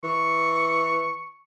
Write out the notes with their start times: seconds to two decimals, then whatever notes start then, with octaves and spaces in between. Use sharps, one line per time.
0.04 E3 C#6